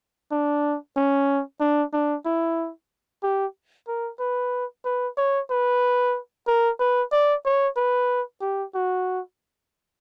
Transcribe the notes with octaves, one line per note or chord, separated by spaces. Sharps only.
D4
C#4
D4
D4
E4
G4
A#4
B4
B4
C#5
B4
A#4
B4
D5
C#5
B4
G4
F#4